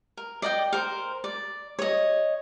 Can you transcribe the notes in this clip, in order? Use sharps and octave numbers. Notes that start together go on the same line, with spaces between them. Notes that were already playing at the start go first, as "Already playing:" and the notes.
A#4
D5 D#5 F#5 G5
A#4 C5
D5
C#5 D#5